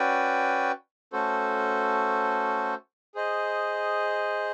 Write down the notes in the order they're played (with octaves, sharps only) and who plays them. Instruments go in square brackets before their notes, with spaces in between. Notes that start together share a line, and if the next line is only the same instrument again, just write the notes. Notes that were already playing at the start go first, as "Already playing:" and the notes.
Already playing: [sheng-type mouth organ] C#4 F#4 B4 D5 G5
A3 C#4 F#4 A4 C5
G#4 C5 D#5